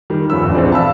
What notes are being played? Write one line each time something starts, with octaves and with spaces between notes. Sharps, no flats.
D#3 G3
E2 F3 C#4 C#5 B5 E6
D#1 A#1 E2
A#1 E3 C4 G#4 C5 D5
F5 A5 B5 E6